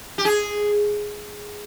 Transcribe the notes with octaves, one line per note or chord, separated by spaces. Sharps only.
G4
G#4